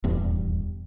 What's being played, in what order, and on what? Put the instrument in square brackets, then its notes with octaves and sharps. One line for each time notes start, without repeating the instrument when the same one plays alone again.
[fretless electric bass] D#1 E2 G2